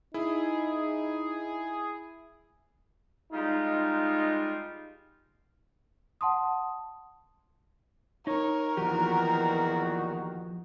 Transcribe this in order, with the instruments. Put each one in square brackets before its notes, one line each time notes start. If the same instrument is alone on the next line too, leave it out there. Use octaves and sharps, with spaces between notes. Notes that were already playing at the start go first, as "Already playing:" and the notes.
[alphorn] D#4 [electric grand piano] E4 [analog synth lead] G#4
[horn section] G3 G#3 D#4 F4
[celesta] F#5 A5 C6 D#6
[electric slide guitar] D#4 [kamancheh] A#4 [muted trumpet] C#5
[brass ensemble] E2 A#2 D#3 [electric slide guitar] F3 G4 [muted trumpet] F#4